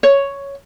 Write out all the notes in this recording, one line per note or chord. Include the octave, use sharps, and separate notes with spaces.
C#5